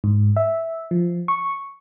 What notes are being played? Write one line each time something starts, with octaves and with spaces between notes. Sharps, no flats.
G#2
E5
F3
C#6